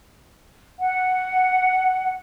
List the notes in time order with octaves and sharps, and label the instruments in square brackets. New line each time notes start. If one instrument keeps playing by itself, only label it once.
[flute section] F#5